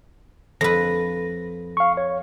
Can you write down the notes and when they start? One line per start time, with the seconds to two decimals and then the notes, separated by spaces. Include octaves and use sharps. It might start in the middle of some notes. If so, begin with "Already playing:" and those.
0.61 F2 B4 A#6
1.77 F5 C#6
1.97 C#5